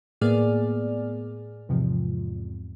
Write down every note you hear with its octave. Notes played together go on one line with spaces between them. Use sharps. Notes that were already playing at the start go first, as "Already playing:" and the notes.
A2 A#3 B3 G#4 D5 F6
E2 G#2 C3 F3